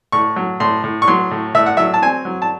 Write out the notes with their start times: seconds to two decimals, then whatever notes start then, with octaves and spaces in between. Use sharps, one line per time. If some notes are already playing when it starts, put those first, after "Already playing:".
0.12 A2 C#6
0.36 F#3
0.60 A2 C6
0.84 A2
1.02 C#6
1.07 F#3 C6
1.31 A2
1.55 A2 E5
1.66 F#5
1.77 F#3 E5
1.94 A5
2.02 C4 G#5
2.25 F#3
2.42 A5